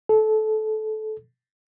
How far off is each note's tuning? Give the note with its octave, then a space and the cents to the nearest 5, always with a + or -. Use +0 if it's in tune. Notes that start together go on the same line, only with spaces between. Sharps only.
A4 -20